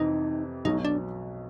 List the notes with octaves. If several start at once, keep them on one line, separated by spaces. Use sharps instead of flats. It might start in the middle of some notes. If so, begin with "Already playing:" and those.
Already playing: F2 C3 E3 D#4
B1 B2 F#3 D#4
D4